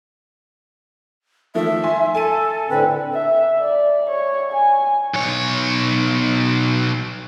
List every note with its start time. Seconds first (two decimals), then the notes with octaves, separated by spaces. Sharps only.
1.55 D#3 F3 A3 E5
1.84 G#5 C6
2.15 A4 G#5 A5 D#7
2.70 A2 D3 C4 B4
3.13 E5
3.59 D5
4.10 C#5
4.52 G#5
5.14 B1 C#5